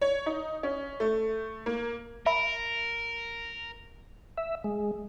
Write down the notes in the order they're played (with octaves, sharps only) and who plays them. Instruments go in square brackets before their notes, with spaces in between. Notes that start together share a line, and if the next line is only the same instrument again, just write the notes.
[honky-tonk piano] C#5
D#4
C#4
A3
A#3
[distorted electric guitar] A#4 [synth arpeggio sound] E5 B5
[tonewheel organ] E5
G#3